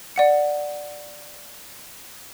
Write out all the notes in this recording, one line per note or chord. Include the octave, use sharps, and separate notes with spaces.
D5 F#5 C#7